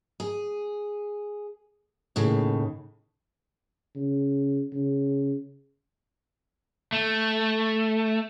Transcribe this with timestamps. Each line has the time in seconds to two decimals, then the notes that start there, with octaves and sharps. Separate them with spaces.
0.20 G#4
2.16 D#2 A2 C#3
3.96 C#3
4.73 C#3
6.92 A3